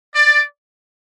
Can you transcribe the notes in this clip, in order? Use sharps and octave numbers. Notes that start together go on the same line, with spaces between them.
D5